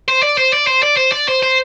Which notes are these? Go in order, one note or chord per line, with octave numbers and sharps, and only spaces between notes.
C5
D5
C5
D5
C5
D5
C5
D5
C5
C5